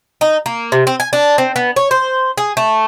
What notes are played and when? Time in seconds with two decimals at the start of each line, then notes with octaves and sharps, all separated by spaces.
0.21 D#4
0.46 A#3
0.72 C3
0.87 C4
1.00 G#5
1.13 D4
1.38 C4
1.56 B3
1.76 C#5
1.91 C5
2.37 G#4
2.57 A3